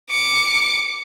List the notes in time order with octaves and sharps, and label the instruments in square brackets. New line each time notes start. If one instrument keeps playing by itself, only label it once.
[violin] D6 C#7